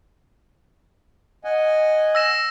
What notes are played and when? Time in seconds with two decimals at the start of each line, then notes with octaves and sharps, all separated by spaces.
1.44 D#5 F#5 G#5
2.15 E6 A#6 E7